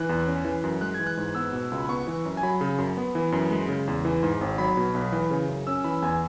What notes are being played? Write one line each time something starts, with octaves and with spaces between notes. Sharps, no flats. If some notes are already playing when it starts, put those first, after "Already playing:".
Already playing: E3 F#6
E2
C#4
E3
F#2
G#3 F#6
E3 G#6
F#6
G#2
B3 E6
B2
C#2
B5
B3 C#6
E3
F#2
G#5
F#3 B5
C#3
F#2
B3
E3
F#2
G#3
C#3
E2
E3
G#2
G#1
F#3 B5
B2
B1
E3
C#3
F#2
C#4 E6
E3 B5
E2 G#5